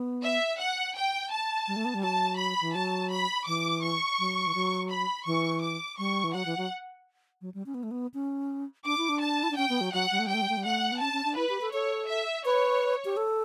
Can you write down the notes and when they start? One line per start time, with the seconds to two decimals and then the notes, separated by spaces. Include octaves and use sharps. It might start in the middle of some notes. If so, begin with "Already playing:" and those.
Already playing: B3
0.24 E5
0.60 F#5
0.95 G5
1.31 A5
1.68 G3
1.76 A3
1.85 B3
1.94 G3
2.03 F#3 A5
2.39 B5
2.61 E3
2.75 F#3 A5
3.11 B5
3.47 E3 D6
3.83 C#6
4.19 F#3
4.47 E3
4.55 F#3
4.90 B5
5.26 E3 C#6
5.62 D6
5.98 G3 C#6
6.24 E3
6.34 F#3 F#5
6.46 E3
6.58 F#3
7.41 F#3
7.54 G3
7.66 C#4
7.74 B3
7.83 A3
7.91 B3
8.14 C#4
8.85 D4 D6
8.98 E4
9.09 D4
9.21 A5
9.43 E4
9.51 D4
9.57 C#4 G5
9.69 B3
9.81 F#3
9.93 F#3 F#5
10.11 G3
10.19 A3
10.27 G3
10.29 A3 G5
10.42 G3
10.49 A3
10.57 G3
10.65 A3 F#5
10.92 B3
11.01 C#4 A5
11.13 C#4
11.25 D4
11.37 E4 B4
11.49 G4
11.61 A4
11.73 A4 C#5
12.09 E5
12.45 B4 C#5
13.05 G4
13.17 A4